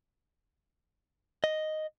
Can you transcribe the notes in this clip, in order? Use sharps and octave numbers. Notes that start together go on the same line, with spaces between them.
D#5